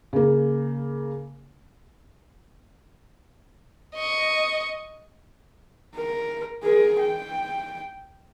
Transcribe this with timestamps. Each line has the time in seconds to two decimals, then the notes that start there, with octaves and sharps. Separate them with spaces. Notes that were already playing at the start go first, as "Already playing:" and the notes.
0.13 C#3 A#3
3.95 D#5 C#6
5.96 A#4
6.64 G#4 A#4
7.00 G5